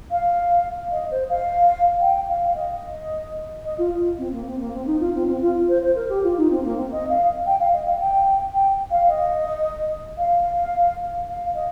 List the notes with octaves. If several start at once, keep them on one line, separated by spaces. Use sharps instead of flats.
F5
D#5
C5
F5
G5
F5
D#5
D#5
F4
C4
A#3
C4
A#3
C4
D#4
F4
C4
C4
F4
C5
C5
A#4
G4
F4
D#4
C4
A#3
C4
D#5
F5
G5
F5
D#5
F5
G5
G5
F5
D#5
F5
F5
D#5